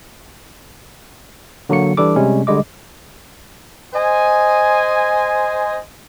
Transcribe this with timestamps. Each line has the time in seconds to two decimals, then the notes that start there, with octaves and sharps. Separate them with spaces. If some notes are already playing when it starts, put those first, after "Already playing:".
1.69 D3 F#3 A#3 F#4 C#7
1.97 E3 G3 D4 A4 D6
2.16 C3 G3 G#3 C#4
2.47 D3 G3 G#3 D#5 D6
3.94 C5 D#5 G#5